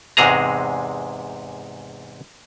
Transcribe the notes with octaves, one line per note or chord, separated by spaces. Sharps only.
E2 G#2 C3 G#3 G#4 A#5